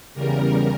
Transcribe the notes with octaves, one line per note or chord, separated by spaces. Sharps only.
E2 C#3 G3 A#4